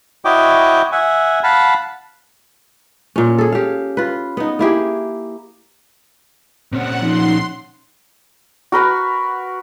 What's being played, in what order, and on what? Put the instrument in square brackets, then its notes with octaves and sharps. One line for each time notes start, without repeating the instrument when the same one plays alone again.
[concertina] E4 F#4 C#5 D#5 G5 D6
E5 F#5 G#5
F5 F#5 A5 B5
[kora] A#2 C#4
G#4 A4
G4 F5
F4 B4
B3 D#4
A#3 E4 G4 G#4
[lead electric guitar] A#2 C#4 [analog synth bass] C4 [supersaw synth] F#5
[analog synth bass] F3 [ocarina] D#4 [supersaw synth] C6
[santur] F#4 A#4 B4 F#5